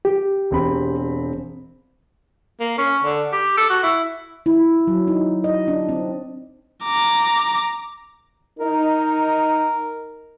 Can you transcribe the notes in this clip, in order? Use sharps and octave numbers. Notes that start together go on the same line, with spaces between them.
G4
E1 C4 B5
A#3
C#4
D3
G4
A4
F#4
E4
E4
F#3
D#4
D#5
D4
C4
A#5 D6
D#4 A#4